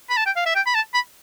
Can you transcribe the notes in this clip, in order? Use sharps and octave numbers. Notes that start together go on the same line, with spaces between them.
B5
A5
G5
F5
E5
G5
B5
A5
B5